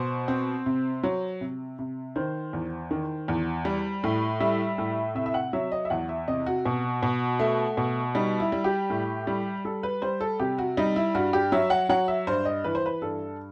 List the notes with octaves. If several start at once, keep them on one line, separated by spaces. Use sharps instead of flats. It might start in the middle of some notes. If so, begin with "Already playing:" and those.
Already playing: B2 C5
C4
C3
F#3
C3
C3
D#3 C5
E2
D#3
E2
G3
A2
G3 E5
A2
C3 E5
E5
F#5
F#3 E5
D#5
E5
E2 F#5
E5
C3 D#5
F#4
B2
B2
A3
B2
G3 D#4
E4
G3
G4
A2
G3
G3 A4
B4
G3 C5
A4
C3 G4
F#4
G3 D#4
E4
G2 F#4
G4
F#3 E5
F#5
F#3 F#5
E5
G2 C5
D#5
E3 B4
C5
B4
G2 A4